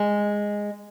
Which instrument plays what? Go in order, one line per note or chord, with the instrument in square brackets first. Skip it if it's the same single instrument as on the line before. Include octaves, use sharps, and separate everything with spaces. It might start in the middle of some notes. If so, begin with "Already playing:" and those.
Already playing: [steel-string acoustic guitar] G#3